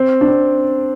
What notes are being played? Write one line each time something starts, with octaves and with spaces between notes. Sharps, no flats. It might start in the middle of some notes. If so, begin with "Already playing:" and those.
Already playing: C4
D4
C4